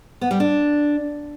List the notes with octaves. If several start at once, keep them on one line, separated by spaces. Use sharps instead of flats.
B3
G3
D4